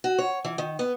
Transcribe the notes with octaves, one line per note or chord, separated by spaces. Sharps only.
F#4
C#5
E3
D#3
B3